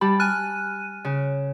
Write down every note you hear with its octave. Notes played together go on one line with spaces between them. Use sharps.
G3 G4 A5 B5
G#5 F6 F#6 D#7
C#3